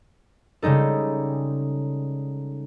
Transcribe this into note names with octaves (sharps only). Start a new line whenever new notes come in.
C#3 G3 G#3 D#4 A4